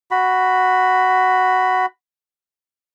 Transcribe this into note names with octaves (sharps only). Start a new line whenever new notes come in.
F#4 B5